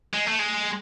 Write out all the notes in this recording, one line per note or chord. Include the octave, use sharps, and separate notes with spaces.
G#3
A3
G#3